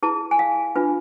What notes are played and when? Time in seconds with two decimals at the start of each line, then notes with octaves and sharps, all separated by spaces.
0.03 E4 G#4 B4 A5
0.31 G#5
0.39 F5
0.76 D4 F4 B4